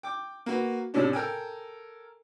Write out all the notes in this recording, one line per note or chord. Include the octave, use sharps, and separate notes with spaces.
G5 D6
A#3 F#4 B4
A2 C3 C#4 D4
A4 A#4 G5 G#5